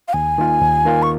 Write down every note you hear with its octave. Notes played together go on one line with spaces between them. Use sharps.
F5
D#2 G#5
D#3 A#3 F4
D#2
D#3 A#3 F4
C#6